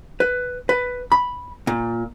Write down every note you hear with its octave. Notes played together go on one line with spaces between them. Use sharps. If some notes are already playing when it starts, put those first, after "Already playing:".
B4
B4
B5
A#2